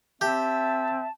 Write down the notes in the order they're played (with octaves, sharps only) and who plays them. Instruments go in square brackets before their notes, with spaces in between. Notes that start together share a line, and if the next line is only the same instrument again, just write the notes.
[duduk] C4 [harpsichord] G4 [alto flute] E5 [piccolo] A5